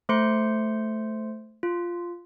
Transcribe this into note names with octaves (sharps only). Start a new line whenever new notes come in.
A3 C5 C6 C#7
F4